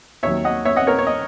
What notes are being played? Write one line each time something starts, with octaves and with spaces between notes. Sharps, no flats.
D#2 D#3 F#3 C#5 E5
D#5 F#5
C#5 E5
D#5 F#5
A#4 C#5
C#5
D#5